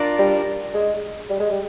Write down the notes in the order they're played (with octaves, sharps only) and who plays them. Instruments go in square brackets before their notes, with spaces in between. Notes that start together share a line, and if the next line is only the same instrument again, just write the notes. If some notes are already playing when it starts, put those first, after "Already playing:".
Already playing: [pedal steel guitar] D4 F4 A#4 D5
[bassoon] G3
G#3
G3
G#3
G3